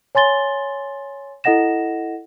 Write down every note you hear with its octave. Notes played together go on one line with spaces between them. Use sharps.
C#5 G#5 C6 A6 G7
E4 A4 D#5 F#5 A#6 E7